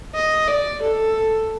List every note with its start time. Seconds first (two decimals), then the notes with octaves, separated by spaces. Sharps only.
0.15 D#5
0.48 D5
0.82 A4